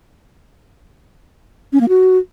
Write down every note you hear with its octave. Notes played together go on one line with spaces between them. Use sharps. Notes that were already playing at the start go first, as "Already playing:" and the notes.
C#4
A#3
F#4